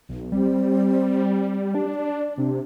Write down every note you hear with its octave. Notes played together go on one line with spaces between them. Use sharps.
B1
G3 C4
D4 G4
D5
C3 D4